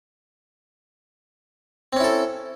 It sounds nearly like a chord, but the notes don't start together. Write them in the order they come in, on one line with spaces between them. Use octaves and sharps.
C4 C#4 E4 A4